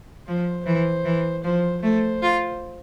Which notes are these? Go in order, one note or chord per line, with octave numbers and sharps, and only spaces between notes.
F3 C5
E3 C5
E3
F3 C5
A3 C5
F4